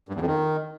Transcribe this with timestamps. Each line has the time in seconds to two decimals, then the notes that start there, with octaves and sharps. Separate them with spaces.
0.09 G2
0.15 E2
0.21 F2
0.27 D#3